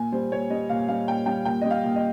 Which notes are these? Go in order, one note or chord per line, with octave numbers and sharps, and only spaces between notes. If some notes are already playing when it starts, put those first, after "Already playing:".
Already playing: A#2 G#5
G3 C5
A#2 C#5
G3 D#5
A#2 F5
G3 F5
A#2 G5
G3 G5
A#2 G5
G3 D#5
F5
A#2
D#5